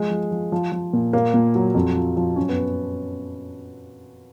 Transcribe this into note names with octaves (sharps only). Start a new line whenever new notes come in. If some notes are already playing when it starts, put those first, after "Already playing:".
Already playing: F3 G#3
F3
F3
F3
F3
A#2
A#2 A#3
A#2
F#3
F2
F3
F3
F#2 C#4
B3